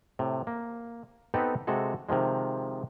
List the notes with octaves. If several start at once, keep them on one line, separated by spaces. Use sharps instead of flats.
A2 C3
A#3
B3 C4 D#4 G4 A4 B4
C3 G#3 F#4 A4
C3 D#3 F3 G#3